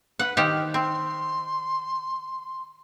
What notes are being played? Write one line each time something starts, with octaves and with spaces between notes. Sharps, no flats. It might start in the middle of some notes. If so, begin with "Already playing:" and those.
B4 F#5
D#3 G4 C5 F6
C4 C6